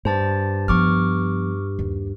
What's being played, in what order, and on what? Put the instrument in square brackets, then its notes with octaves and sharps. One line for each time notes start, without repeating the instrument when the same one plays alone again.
[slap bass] G2 [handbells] C5 A5 A6
[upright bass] F3 B3 [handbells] C#6 D6 F6
[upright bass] D#2